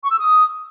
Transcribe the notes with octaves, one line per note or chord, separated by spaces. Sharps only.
C#6
E6
D#6